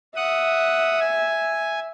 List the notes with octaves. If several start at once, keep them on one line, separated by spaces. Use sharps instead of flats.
E5 F#5 D#6
G#5